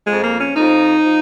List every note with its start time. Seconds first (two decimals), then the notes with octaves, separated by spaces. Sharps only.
0.07 F2 F3 G#3
0.24 A#3
0.41 C#4
0.57 F2 F3 D#4
1.06 F3